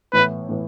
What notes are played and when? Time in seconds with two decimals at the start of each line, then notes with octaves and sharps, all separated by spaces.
0.13 A2 E3 B3 E4 B4
0.49 A2 E3 B3